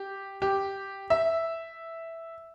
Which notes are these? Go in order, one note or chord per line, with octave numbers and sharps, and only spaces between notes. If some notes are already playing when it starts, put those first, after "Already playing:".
Already playing: G4
G4
E5